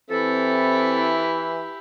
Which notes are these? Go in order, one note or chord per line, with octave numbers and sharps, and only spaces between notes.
E3 C4 E4 G4 A4